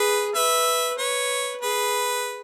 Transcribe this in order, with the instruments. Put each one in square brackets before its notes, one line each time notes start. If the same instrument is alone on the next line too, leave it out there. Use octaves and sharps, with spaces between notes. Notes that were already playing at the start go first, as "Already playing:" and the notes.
Already playing: [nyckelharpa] G#4 [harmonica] B4
[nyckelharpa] B4 [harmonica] E5
[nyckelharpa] B4 [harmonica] C#5
[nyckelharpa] G#4 [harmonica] B4